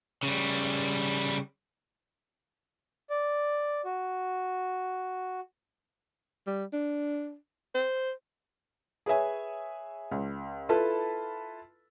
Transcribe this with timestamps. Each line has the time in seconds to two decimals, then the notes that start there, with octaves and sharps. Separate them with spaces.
0.23 C#3 G3
3.10 D5
3.85 F#4
6.47 G3
6.73 D4
7.75 C5
9.06 G#4 B4 C#5 E5 G#5
10.12 C#2
10.69 E4 F4 A4 B4 A5 B5